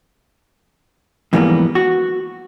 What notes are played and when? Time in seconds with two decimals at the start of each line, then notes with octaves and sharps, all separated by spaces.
1.33 F2 G#2 E3 G3 A#3 B3
1.75 F#4